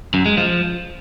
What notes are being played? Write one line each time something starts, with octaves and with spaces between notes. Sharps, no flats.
F#2
G#3
F3